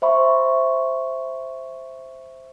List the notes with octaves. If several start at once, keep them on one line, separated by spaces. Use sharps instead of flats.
C5 E5 B5 C#6